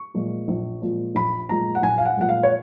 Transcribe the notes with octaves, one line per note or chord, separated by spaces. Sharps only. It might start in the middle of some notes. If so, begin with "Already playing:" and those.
Already playing: C#6
A#2 F3 G#3
A#1
A#2 F3 G#3
A#1 B5
A#2 F3 G#3 A#5
F#5
A#1 G#5
F5
F#5
A#2 F3 G#3 F#5
F5
C#5